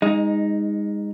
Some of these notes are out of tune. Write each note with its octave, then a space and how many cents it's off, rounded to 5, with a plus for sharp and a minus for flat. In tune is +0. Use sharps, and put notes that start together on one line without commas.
G#3 -25 D#4 +5